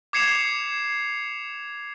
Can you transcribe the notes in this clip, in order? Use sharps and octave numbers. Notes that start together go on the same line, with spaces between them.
D6 G#6 C7 C#7 E7 F7